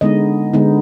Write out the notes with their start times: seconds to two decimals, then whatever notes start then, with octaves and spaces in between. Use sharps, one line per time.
0.01 D3 G#3 B3 D#4 D#5
0.53 D3 G#3 B3 D#4